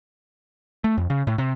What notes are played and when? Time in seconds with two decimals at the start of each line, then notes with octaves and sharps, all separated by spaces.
0.84 A3
0.97 F2
1.10 C#3
1.27 A2
1.38 C3